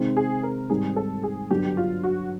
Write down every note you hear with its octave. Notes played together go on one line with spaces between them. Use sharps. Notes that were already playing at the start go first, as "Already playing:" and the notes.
Already playing: C3 D#3 G#3 C4 D#4
G#4
A#4
G#2 D#3 G3 C4 G#4
A4
G#4
G2 D3 F#3 B3 D4 G4
F4
F#4